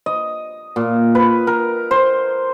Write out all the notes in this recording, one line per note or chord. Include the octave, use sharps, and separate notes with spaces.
D#5
A#2
B4
A#4
C5